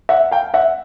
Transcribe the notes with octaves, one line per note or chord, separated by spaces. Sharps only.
E5 F#5
F5 G5
E5 F#5